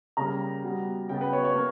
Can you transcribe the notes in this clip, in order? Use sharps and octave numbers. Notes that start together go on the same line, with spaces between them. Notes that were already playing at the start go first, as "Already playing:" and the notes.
C#3 G3 A#3 A#5
B2 G3 B3
C#3 F#3 B3 G5
B4
C#5
C#5
A#3